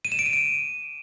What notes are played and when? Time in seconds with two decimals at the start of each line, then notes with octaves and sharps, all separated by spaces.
0.05 D#7
0.12 E7
0.19 D7
0.26 D#7
0.33 D7